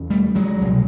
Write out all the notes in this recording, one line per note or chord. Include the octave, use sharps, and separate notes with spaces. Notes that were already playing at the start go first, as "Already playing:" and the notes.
Already playing: E2 C#3
G3 A3
F#3 G#3
C2 B2